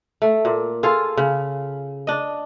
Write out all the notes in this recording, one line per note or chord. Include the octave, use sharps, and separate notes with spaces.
A3
A#2
F4 G#4 A4 F5
C#3
D4 D#5